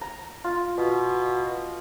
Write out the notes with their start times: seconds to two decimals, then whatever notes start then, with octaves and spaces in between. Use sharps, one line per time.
0.01 A#5
0.44 F4
0.78 B2